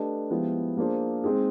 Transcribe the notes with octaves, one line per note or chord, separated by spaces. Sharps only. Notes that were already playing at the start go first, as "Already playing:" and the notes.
Already playing: A3 D4 G4 B4 D#5
F3 G#3 B3 E4 G4
A#3 D4 F4 G#4 C5
G#3 C4 D#4 G#4